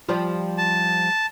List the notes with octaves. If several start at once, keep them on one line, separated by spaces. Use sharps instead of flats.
F3 G3 F4
A5